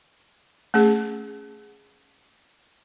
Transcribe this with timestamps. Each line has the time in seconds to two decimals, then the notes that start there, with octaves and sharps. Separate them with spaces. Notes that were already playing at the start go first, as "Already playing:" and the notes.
0.74 A3 C#4 G#4